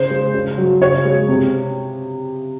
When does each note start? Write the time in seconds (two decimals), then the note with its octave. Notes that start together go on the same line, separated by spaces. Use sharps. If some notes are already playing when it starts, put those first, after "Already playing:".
Already playing: C#3 C5
0.11 G#3
0.34 C#3
0.58 F#3
0.81 C#3 C#5
1.05 G#3
1.28 C3